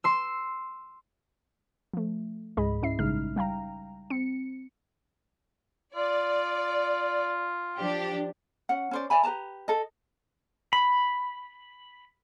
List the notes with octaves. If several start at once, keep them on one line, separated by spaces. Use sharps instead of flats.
C6 E6
F3 A3
C#2 G#2 G#3 G#4 D#5 B5
G#2 C#4 E4 E5 C7
A#1 C#3 G3 G#3 D#4 F6
G3 F5 G5 A#5
C4 C#7
F4 D5
F3 D4 G4
C#4 F#5
C#4 C5 D5
D5 E5 G#5 B5
G4 B4 A5 A#5
A4 D#5
B5